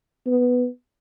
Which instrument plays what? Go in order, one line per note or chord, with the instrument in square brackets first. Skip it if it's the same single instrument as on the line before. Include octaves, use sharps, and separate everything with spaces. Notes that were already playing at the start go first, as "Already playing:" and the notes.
[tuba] B3